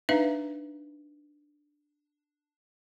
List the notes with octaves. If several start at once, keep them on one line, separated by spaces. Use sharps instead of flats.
D4 D#4 B4 E5 F5